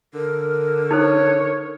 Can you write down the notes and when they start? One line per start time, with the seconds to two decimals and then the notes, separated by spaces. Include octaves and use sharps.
0.14 D3 A#4
0.91 D#4 A4 C5 C#5